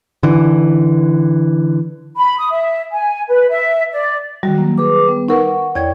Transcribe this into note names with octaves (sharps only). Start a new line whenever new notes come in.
D3 E3
B5
D#6
E5
G#5
B4
E5
D5
D#3 G3 F#4
F#3 A#3
G#4 B4 D6
G3 B3
D#4 A#4 B4 F#5 C#6
E2 C#5 D5 G5 G#6